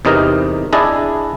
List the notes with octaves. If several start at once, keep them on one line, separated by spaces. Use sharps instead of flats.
E2 C3 D#4 A#4
D4 E4 G#4 D#5 G#5 A5